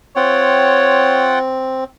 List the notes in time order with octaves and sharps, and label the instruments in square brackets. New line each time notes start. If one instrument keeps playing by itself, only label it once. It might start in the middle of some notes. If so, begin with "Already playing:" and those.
[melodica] C4 [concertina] F4 F#5 G5 [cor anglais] C#5